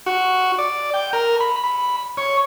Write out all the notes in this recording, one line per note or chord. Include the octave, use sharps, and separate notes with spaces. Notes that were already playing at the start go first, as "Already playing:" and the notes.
F#4
D5
G5
A#4
B5
B5
C#5